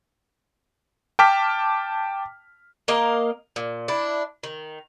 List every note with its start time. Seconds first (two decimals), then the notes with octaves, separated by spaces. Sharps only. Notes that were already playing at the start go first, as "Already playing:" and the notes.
1.19 G5 A5 D6 F6 B6
2.88 A#3 A#4 D#5 F5
3.56 A#2
3.88 D4 E4
4.43 D#3